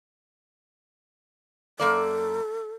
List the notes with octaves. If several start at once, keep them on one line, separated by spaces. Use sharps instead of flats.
F#2 A#3 A4 D5